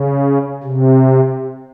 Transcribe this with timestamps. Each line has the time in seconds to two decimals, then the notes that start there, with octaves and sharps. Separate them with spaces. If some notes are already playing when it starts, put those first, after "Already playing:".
Already playing: C#3
0.63 C3